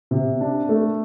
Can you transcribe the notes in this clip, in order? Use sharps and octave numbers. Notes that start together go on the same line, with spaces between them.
C3
D4
A3